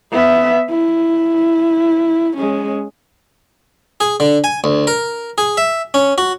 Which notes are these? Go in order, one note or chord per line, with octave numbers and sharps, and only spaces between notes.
B3 E5
E4
G#3 C#4
G#4
D3
G#5
D2
A#4
G#4
E5
C#4
F#4